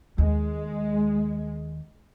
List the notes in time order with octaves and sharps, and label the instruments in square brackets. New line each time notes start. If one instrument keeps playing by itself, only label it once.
[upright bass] D#2 [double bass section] G#3